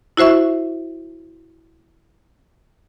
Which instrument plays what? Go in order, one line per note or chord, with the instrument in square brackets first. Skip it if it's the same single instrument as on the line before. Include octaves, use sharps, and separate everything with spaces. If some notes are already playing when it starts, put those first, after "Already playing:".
[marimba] E4 F#4 C5 E5 C#6